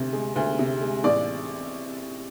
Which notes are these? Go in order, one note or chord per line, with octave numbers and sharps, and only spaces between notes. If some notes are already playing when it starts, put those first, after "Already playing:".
Already playing: D2 C3
G#3
D2
C3
G#3
A1 D5